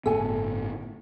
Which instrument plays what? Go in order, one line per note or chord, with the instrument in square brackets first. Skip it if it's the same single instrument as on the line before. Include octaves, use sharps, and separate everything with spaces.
[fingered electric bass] G1 A2 B3 [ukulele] A4 G#5